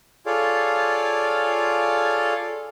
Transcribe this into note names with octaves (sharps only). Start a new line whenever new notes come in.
F4 G#4 A4 C#5 D5 F5